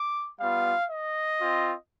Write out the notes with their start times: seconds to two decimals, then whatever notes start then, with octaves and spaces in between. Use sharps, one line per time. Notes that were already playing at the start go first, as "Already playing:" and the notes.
Already playing: D6
0.40 G3 B3 F4 F5
0.89 D#5
1.39 C4 F4